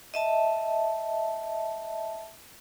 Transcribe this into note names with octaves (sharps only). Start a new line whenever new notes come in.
D#5 E5 A5